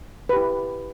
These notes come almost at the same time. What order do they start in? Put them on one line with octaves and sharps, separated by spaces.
B4 G4 E4